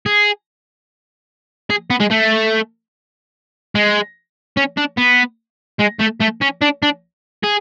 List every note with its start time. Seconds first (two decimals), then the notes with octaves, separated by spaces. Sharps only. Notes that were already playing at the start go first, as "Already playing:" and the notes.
0.06 G#4
1.70 G#4
1.91 B3
2.00 G#3
2.11 A3
3.75 G#3
4.57 C#4
4.78 D4
4.98 B3
5.80 G#3
6.01 A3
6.21 A3
6.42 C#4
6.62 D4
6.83 D4
7.44 G#4